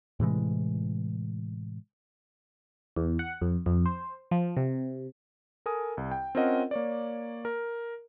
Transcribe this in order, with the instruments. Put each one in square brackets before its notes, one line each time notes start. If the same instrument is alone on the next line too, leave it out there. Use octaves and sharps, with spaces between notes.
[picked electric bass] A2 C3 E3 G#3
[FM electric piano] E2
F#5
F2
F2
C5
F3
C3
[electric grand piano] A4 A#4 G#5 D#6
C2
G5
C4 C#4 F4 A#4 D#5 F#5
A#3 C#5 D5
A#4